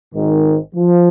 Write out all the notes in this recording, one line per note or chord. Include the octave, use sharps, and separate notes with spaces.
G#1 G#2 D#3
F3